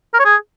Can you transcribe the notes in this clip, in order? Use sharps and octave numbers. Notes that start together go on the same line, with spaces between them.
A#4
C#5
G#4